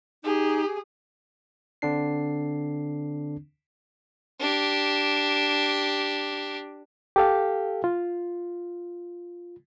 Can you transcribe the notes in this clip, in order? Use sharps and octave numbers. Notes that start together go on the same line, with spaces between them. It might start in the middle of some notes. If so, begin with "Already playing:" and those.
D#4 G4 G#4
D3 C4 D4 C7
D4 G4
G4 A4 F5
F4